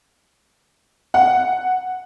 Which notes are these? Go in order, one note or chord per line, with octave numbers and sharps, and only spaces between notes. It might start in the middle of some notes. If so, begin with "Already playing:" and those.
F#5